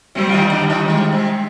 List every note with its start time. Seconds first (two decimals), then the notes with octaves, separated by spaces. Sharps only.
0.15 C3 G3 C4
0.29 F4
0.34 D#3 D#4
0.51 D3 D4
0.70 D#3 D#4
0.88 D#3 G#3 D#4
1.12 C3 C4